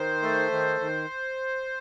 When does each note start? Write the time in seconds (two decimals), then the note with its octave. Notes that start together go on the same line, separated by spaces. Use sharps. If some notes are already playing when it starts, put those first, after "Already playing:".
Already playing: D#3 C5
0.22 A3
0.52 D#3
0.81 D#3